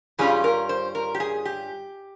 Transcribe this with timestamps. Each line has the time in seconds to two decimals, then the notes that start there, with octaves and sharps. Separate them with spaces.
0.19 G2 G3 C#4 F4 G#4
0.44 A#4
0.69 C5
0.95 A#4
1.15 G4
1.20 G#4
1.45 G4